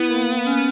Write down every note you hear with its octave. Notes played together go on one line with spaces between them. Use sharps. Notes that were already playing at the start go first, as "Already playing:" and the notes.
Already playing: B3 E4
A#3
C#4